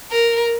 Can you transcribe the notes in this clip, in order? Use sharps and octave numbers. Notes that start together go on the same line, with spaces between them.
A#4